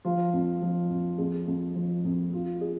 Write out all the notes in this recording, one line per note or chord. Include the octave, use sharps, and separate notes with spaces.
F3 F4
F2
F3
F2
F2 G#4
F2
F3
F2
F2 F4
G#4